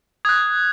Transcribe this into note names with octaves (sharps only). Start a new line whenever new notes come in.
D#6 F#6 G#6